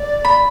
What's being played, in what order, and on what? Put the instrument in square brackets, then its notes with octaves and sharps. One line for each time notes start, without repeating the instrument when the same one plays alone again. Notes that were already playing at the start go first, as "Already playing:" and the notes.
Already playing: [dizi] D5
[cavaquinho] B5